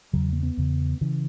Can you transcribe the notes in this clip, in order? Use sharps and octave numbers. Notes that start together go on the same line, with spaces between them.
E2 C#3 F#3
A#3
B3
E2 C#3
C#3 E3